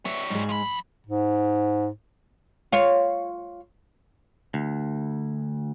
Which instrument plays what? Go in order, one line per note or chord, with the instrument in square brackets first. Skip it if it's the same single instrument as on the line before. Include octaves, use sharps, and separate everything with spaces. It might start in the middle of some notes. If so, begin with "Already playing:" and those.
[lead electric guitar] G3 C#5 [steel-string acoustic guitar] B3 E5
[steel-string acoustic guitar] G#2 G#3
[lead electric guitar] F3 B5
[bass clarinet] G#2
[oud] F4 C#5
[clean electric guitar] D2